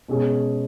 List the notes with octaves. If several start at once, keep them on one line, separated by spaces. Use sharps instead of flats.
B2 G#3 C#4 G#4